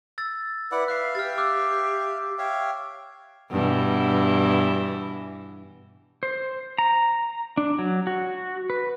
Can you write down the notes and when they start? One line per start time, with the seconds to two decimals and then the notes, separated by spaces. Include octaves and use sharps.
0.18 E6 A6
0.71 E4 B4 D5 F#5
0.88 E5 F5 F#6 C7
1.15 G4 F6 A6
1.38 D6 E6 F#6
2.38 C#5 E5 F5 G5
3.50 G2 B2 E3
6.23 C5
6.79 A#5
7.57 D4
7.79 F#3
8.07 F#4
8.70 B4